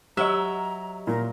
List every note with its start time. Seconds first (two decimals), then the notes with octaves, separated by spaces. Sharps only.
0.17 F#3 G4 D#5 E5 A#5
1.07 A#2 F3 A#4